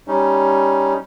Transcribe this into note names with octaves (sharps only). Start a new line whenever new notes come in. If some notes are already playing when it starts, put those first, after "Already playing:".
G3 C#4 D#4